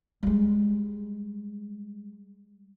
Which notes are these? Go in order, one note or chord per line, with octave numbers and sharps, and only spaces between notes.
G3 G#3